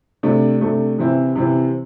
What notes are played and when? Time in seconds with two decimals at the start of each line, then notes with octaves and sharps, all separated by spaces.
0.23 C3 A3 D4
0.61 C3 A3 D4
0.99 C3 E3 C4 E4
1.36 C3 E3 C4 E4